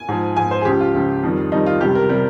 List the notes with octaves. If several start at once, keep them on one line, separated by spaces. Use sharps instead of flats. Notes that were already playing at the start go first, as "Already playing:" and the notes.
Already playing: G#5
G#2 F3
G#2 F3 G#5
C5
G#4
C#2 C#3 F3 G4
F4
C#2 C#3 F3
F2 D#3 G3
F2 D#3 G3 D#4
F4
C#2 C3 G3 G4
A#4
C3 G3 A#4